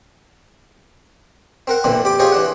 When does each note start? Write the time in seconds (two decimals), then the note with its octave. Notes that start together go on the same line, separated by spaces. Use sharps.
1.67 C4 A#4 F#5
1.84 A#1 D3 E3 C4
2.05 G4 D6
2.19 F4 G4 G#4 C5 C#5 D#5
2.32 E3 D4 F#5